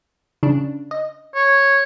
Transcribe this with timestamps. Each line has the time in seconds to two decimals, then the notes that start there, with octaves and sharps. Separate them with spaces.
0.43 C#3 D4
0.91 D#5
1.35 C#5